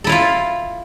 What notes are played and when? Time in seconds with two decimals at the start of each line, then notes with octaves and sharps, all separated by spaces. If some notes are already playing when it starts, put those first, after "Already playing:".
0.04 A4
0.07 E4
0.09 F5
0.12 F4